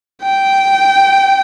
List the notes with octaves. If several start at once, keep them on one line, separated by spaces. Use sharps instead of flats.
G5